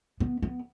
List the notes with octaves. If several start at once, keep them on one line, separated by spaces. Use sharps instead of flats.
B3
B3